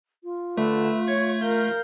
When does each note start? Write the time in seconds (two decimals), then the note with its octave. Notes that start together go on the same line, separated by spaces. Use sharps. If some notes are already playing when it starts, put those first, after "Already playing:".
0.24 F4
0.57 D3 A3 B4 E5
1.08 C#5 G#6
1.42 A#4 F5 G6